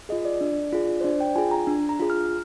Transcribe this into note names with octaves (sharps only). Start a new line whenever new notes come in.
F4 G#4 D#5
D5
D4
F4 G#4
C5
D4 D5
G5
F4 G#4 G#5
A#5
D4
A#5
F4 G#4
F6